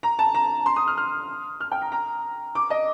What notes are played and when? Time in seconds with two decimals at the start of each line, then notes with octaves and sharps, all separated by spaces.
0.03 A#5
0.19 A5
0.34 A#5
0.66 C6
0.76 D#6
0.87 F6
0.97 F6
1.60 F6
1.72 G5
1.82 A#5
1.92 A#5
2.55 D6
2.70 D#5